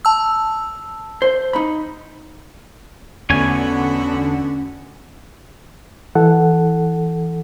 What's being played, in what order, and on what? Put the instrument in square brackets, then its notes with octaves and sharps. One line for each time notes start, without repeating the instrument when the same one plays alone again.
[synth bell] A5 E6
[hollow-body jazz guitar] C5
D#4 B5
[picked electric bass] E2 A3 [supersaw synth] D3 [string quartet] B3 F#4 F#5 [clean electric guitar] C#4 G#5
[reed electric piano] E3 A4 F#5